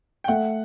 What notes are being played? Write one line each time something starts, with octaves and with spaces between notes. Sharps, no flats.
G5
A3 F#5